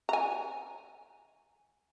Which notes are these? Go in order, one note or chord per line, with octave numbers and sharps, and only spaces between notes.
G#5 A#5